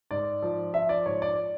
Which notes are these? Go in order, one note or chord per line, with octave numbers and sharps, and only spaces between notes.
G#2 D5
F3
F3 E5
D5
G#2 C#5
D5